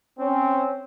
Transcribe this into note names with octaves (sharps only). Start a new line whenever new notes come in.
C4 C#4